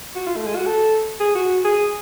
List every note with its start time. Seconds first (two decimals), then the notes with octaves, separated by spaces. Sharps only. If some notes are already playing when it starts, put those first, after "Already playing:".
0.15 F#4
0.27 F4
0.36 A3
0.46 G#3
0.56 F#4
0.66 A4
1.20 G#4
1.35 F#4
1.65 G#4